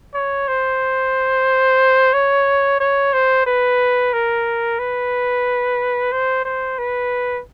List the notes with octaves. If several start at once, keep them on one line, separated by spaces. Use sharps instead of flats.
C#5
C5
C#5
C#5
C5
B4
A#4
B4
C5
C5
B4